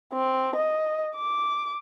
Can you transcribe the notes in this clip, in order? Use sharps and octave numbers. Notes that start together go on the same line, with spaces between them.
C4
D#5
D6